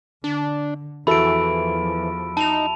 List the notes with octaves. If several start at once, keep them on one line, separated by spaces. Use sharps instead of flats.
D3 D4
E2 E3 F3 E4 F#4 A4 B5 D7
D#4 A5 F7